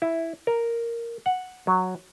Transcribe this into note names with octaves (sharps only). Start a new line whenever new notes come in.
E4
A#4
F#5
F#3